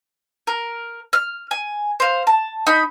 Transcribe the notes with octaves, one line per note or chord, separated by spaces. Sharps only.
A#4
F6
G#5
C5 F5
A5
D#4 B5